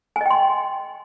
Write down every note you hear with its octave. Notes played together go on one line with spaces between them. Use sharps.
D#5 G5 G#5 C6